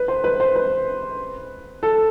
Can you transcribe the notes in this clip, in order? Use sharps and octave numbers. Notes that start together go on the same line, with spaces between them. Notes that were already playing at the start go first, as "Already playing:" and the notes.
Already playing: B4
C5
B4
C5
B4
A4